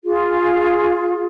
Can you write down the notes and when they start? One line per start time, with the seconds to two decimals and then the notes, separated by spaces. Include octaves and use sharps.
0.04 F4 G#4